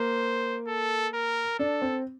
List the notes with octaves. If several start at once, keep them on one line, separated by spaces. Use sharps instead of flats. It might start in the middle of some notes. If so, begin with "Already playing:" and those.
Already playing: A#3 C5
A4
A#4
D4 A4
C4